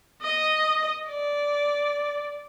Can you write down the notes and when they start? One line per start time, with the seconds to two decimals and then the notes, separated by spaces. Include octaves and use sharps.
0.22 D#5
1.08 D5